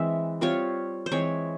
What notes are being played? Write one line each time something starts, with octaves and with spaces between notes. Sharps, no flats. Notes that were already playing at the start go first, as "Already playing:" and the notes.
Already playing: E3 G#3 C4 E5
G3 C4 F4 C#5
C5
E3 G#3 C4 C#5